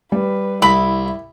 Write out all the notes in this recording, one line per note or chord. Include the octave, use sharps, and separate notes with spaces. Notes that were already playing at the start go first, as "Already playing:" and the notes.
G3 B4
C2 E4 B5